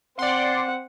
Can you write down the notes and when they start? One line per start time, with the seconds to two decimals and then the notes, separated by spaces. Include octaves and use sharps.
0.19 C4 D5 F#5 C6